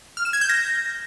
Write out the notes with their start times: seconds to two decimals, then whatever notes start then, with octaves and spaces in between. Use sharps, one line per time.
0.17 F6
0.25 E7
0.33 G#6
0.41 G6
0.49 A#6